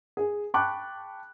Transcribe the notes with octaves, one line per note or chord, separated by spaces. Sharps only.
G#4
G5 A5 B5 C#6 D6 F#6